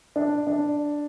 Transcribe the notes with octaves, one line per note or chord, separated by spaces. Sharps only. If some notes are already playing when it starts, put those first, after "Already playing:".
D4
D4